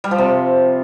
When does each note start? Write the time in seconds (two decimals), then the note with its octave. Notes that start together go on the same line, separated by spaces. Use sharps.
0.04 G3
0.11 F3
0.18 C3